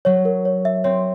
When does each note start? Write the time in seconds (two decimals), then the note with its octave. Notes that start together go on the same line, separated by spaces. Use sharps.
0.05 F#3 C#5
0.25 A#4
0.45 C#5
0.65 E5
0.84 C4 C#5